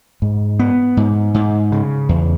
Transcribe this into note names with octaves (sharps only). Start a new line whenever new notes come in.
G#2
B3
G#2
G#2
C#3
E2